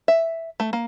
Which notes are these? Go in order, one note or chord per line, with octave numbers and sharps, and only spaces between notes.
E5
A3
A#3